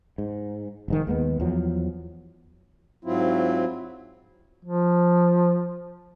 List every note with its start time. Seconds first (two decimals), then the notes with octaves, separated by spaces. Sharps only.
0.18 G#2
0.88 F1 G#2 D#3
1.07 D#2 G#3 A3 B3
1.40 E2 F3 F#3
3.05 G#2 F#3 C4 E4 F4
4.65 F3